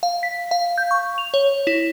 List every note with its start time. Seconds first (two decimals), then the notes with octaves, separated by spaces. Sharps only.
0.03 F5
0.23 B6
0.51 F5
0.78 G6
0.91 C#6
1.18 F7
1.34 C#5
1.67 E4